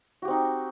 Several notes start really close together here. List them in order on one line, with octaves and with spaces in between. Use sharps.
F#4 G4 C4 D#4